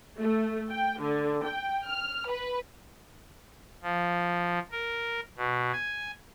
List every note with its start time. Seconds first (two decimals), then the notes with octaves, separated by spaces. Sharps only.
0.19 A3
0.70 G5
0.99 D3
1.44 G5
1.86 F6
2.30 B4
3.82 F3
4.71 A#4
5.38 B2
5.73 G#5